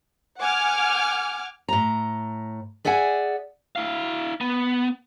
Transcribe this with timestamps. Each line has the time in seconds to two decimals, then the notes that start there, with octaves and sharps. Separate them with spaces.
0.38 F#5 G#5 D6 F6
1.68 A2 A#5
2.85 G#4 D5 E5 F#5 G#5
3.76 E4 F5
4.41 B3